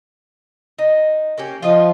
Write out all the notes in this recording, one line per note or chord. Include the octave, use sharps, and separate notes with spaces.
D#4
A#3 C#4 G4
F3 F4 D#5